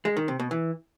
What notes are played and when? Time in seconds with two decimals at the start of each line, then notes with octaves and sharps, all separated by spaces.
0.05 G#3
0.17 D#3
0.28 C3
0.39 B2
0.51 E3